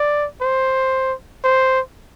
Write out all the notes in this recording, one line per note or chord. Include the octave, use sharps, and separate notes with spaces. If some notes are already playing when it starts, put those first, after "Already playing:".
Already playing: D5
C5
C5